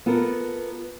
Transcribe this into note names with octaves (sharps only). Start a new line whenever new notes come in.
B3 F4 A4 A#4